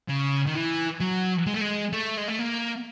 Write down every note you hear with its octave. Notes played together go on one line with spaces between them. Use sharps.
C#3
D#3
E3
F#3
G#3
A3
G#3
A3
G#3
A3
A#3